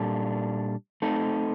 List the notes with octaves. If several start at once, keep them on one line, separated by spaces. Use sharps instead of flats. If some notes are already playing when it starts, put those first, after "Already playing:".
Already playing: A#2 G3 D4 A4
A3 C4 D#4 A4